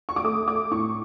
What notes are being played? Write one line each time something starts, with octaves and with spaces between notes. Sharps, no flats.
C#6
D6
A3 D#6
D6
A2 C#6